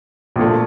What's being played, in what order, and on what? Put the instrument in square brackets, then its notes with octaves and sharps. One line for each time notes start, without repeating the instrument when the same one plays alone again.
[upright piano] A#1 A#2 A3